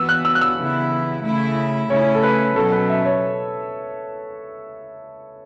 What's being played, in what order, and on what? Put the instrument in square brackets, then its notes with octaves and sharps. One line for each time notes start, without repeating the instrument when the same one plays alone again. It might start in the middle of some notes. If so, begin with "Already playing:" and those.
Already playing: [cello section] E3 B3 F#4 [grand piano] E6
[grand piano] F#6
E6
F#6
E6
[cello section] C#3 E3 B3 E4
C#3 A3 E4
[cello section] C#3 A3 C#4 E4 [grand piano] C#5
[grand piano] A4
B4
[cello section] B2 F#3 C#4 [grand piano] A4
[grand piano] B4
E5
C#5